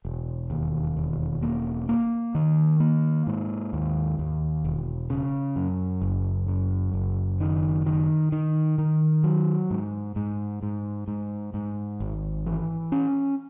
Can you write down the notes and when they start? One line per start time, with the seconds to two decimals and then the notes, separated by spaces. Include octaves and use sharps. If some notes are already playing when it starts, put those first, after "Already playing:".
0.05 E1
0.50 D#2
0.97 E1
1.43 A#3
1.89 A#3
2.35 D#3
2.80 A#3
3.27 G#2
3.73 D#2
4.19 D#2
4.64 E1
5.10 C#3
5.56 F#2
6.02 F#1
6.48 F#2
6.94 F#1
7.40 D#3
7.86 D#3
8.32 D#3
8.78 D#3
9.24 F#3
9.71 G#2
10.16 G#2
10.63 G#2
11.08 G#2
11.54 G#2
12.00 G#1
12.46 E3
12.92 C#4